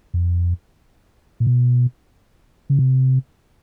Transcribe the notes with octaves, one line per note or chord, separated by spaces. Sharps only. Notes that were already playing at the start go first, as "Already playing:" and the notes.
F2
A#2
B2
C#3
C3